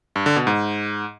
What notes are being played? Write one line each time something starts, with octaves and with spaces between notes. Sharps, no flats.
G2
D3
B2
G#2